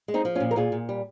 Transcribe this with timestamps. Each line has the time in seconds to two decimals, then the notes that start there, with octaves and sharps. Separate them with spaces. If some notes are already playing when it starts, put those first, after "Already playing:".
0.08 G#3
0.14 C4 D#4
0.25 F3
0.35 C#4 F4
0.40 A#2
0.51 A#4
0.56 A#2 F4 G#4
0.72 A#2
0.89 G3